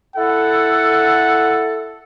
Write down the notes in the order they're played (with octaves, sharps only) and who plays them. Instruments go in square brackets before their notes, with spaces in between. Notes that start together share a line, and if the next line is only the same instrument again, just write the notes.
[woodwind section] E4 A4 [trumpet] F#5